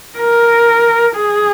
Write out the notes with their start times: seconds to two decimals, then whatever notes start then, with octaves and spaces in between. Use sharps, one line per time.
0.19 A#4
1.16 G#4